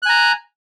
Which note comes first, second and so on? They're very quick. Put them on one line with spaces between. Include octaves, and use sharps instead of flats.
F#6 G#5 A#5